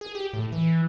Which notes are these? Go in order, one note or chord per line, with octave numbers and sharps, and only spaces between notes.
G#4
G4
A2
E3